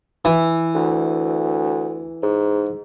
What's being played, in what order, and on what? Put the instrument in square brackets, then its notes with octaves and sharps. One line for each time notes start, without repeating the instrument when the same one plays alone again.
[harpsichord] E3
[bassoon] D2
G#2